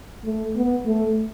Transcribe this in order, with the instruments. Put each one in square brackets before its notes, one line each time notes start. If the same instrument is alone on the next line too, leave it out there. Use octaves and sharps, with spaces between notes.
[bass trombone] A3
B3
A3